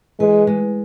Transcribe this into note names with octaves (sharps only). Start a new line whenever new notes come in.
E3 G#3
G#3